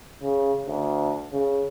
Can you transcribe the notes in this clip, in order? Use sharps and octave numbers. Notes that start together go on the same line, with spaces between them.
C#3
D2
C#3